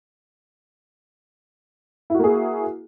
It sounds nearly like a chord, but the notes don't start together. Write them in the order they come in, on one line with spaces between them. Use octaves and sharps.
E4 F#4 A#3 G#4